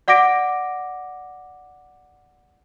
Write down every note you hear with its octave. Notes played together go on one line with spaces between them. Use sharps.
D5 F#5 D6 A#6 D7